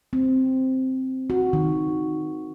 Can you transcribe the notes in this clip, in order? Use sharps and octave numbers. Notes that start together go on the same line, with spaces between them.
C4
F#4
D#3